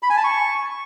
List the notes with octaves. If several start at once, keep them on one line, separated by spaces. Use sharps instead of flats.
B5
G#5
A5
C#6